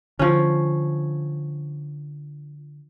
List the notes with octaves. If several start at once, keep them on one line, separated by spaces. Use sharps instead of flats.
D3 F3 C#4